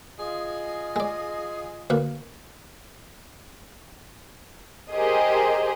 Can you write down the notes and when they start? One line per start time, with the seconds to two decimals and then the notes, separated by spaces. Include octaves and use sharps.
0.19 F4 G#4 D#5
0.96 G#3 D5
1.90 D2 A#3 B4
4.93 G4 G#4 A#4 C5 D#5